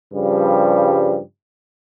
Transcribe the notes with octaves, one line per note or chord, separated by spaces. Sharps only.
G2 C#3 F3 G3